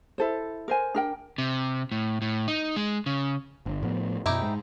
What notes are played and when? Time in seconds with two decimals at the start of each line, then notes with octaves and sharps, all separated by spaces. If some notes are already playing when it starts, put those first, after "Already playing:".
0.18 E4 A4 C5
0.68 A#4 C5 G#5
0.94 D4 A#4 G5
1.38 C3
1.92 A2
2.22 A2
2.48 D#4
2.76 G#3
3.06 C#3
3.66 G1
3.83 A2 F3 B3
4.26 F#2 B2 D#4 E4 G4
4.42 G#2 G#3